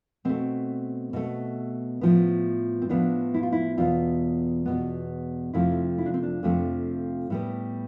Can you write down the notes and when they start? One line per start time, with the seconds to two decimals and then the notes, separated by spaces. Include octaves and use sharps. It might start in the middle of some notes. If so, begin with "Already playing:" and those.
0.25 B2 A3 C4
1.13 B2 A3
2.01 A2 F3 B3
2.82 C4
2.89 A2 F3 B3 D4
3.34 E4
3.43 F4
3.52 E4
3.78 E2 B2 B3 F4
4.66 E2 B2 B3
5.53 F2 C3 F3 A3 E4
5.98 E4
6.06 D4
6.14 C4
6.23 D4
6.43 F2 C3 F3 A3
7.30 A2 G3 B3